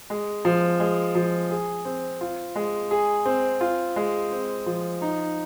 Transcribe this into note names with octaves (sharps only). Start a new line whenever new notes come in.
G#3
F3
G#3
F3
G#4
C4
F4
G#3
G#4
C4
F4
G#3
C4
F3
D#4